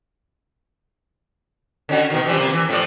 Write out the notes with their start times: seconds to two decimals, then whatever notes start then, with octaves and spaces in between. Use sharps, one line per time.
1.89 D3 C#4 F#4
2.10 B2 D#3
2.25 E3 F3 G3
2.39 C3 A#3
2.53 E3
2.69 A2 F3 D5